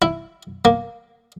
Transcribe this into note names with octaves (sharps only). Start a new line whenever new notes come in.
E4
A#3